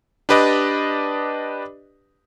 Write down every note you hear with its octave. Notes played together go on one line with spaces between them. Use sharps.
D4 G4 B4 D5 D#5